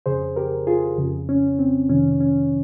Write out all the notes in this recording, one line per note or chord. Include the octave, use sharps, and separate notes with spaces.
F2 C#3 G#4 C5
G4 A#4
F4 G#4
F2 C#3
C#4
C4
F2 C3 D#3 C#4
C#4